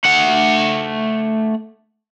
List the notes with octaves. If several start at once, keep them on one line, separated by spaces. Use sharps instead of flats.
A3 F#5